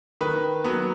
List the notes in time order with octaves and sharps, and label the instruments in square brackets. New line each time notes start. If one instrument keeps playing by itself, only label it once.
[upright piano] D#3 B4
F#3 B3